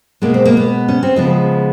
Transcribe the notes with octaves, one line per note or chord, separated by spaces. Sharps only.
B2 G#3 A#3
C4
A#3
B3
C#4
C4
C#3 F3 G#3 B3